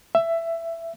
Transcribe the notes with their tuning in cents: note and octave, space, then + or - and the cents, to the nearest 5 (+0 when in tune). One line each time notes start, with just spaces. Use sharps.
E5 +15